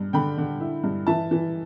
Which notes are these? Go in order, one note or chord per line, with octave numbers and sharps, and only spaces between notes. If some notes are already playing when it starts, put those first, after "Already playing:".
Already playing: G2
D3 G5 B5
D3
E4
G2
E3 E5 A5
E3